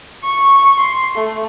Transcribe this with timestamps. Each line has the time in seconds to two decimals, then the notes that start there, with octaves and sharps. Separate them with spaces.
0.24 C#6
0.79 C6
1.16 A3